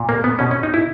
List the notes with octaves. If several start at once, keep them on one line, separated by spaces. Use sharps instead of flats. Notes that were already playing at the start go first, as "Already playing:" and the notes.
Already playing: A#2
A#3
B3
B2 C#4
C#4
D#4
E4